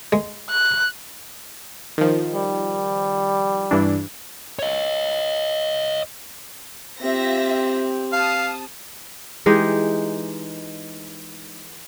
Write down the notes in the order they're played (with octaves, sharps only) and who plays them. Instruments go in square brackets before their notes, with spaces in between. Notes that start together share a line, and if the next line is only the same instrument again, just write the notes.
[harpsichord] G#3
[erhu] F#6
[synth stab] D#3 F3
[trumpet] G3
[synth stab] G2 E3 D4
[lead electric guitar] C#5 D#5
[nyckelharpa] C4 G4 [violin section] F4 E5 A#6
[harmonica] F5 [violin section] A5 D#6
[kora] E3 G#3 D#4 G4